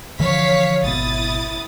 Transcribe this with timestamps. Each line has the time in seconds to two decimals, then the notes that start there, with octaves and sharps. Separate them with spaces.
0.20 D3 E3 F3 C#5 F5 B6
0.84 G#1 B2 E4 D#6 A6